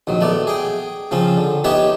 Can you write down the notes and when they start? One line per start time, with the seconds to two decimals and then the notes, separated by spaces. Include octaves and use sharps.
0.07 A#1 D#3 F#3
0.21 A3 B3 D5
0.47 G#4 G5
1.11 C#3 F3 C4 C#4
1.37 D3
1.64 B3 D#4 G4 B4 C#5 E5